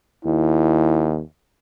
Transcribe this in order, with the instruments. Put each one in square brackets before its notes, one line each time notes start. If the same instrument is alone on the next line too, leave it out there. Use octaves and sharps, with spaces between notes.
[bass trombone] D#2 [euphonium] E4